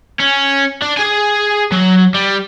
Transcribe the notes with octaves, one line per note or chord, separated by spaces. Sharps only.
C#4
D4
G#4 G#5
F#3
G3